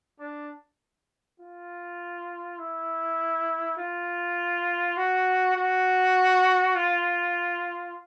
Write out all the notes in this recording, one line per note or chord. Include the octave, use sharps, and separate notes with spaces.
D4
F4
E4
F4
F#4
F#4
F4